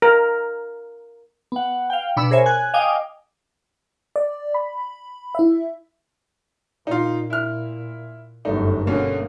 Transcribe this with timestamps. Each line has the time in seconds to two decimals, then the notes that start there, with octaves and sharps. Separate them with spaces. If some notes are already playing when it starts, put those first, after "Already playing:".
0.02 A#4
1.52 B3 F#5
1.90 F5 G5
2.16 B2 D4 B5 E6
2.31 G#4 A#4 C5 C#5 E5 G#5
2.46 G#5 F#6 G#6
2.74 D#5 F5 G5 G#5 D6 D#6
4.16 D5
4.54 B5
5.35 E4 E5
6.87 A#2 D#4 F4
7.30 E4 F6
8.45 G1 F#2 A3 D#4
8.87 B2 D3 A#3 C#4